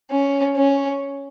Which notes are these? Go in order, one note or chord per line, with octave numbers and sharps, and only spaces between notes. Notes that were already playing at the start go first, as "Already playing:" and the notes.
C#4
C#4